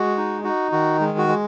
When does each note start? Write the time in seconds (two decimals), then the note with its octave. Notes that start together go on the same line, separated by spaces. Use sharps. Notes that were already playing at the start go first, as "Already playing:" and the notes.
Already playing: G#3 F#4
0.17 D#4
0.44 D#4 F#4
0.72 D#3 F#4
1.00 G#3
1.18 F#4
1.28 G#3